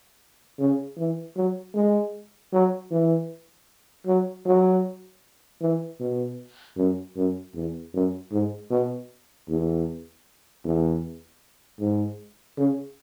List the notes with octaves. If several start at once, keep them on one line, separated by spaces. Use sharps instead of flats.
C#3
E3
F#3
G#3
F#3
E3
F#3
F#3
E3
B2
F#2
F#2
E2
F#2
G#2
B2
E2
E2
G#2
C#3